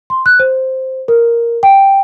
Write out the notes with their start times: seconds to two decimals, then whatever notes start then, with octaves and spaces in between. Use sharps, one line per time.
0.10 C6
0.26 F#6
0.39 C5
1.08 A#4
1.63 G5